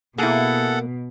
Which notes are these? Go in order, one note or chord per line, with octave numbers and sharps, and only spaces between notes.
B2 A#3 E4 G#4 A4 F#5